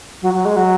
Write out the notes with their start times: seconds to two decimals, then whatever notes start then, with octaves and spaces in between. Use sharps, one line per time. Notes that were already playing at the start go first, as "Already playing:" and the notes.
0.21 F#3
0.33 F#3
0.45 G#3
0.56 F#3